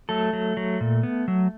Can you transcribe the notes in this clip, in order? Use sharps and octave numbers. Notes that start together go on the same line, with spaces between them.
F#3 A3 A4
F#3
F#3
A#2
B3
F#3